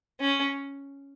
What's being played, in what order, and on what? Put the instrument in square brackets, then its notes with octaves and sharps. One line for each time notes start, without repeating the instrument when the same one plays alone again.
[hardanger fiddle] C#4